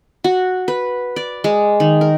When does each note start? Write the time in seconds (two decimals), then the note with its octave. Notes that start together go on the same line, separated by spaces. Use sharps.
0.24 F#4
0.68 B4
1.16 D5
1.44 G#3
1.80 D#3
2.01 A#4